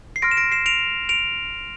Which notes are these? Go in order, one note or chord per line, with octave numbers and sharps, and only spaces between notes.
C7
C6 F6 A#6 D7
E7
A#6 D7
C7 E7
D7 F7
D7 F7